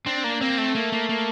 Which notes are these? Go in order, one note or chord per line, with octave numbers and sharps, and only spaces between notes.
C4 D4
A#3
A#3 C4
A3
A#3
A#3
A#3